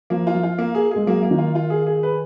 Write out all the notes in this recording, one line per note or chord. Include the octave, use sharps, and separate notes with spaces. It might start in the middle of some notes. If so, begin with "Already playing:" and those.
F3 A#3
F4
F3
F4
A#3
G#4
G#3 G#4
F#3 A#3
A#3
D#3
F4
F4
G#4
G#4
B4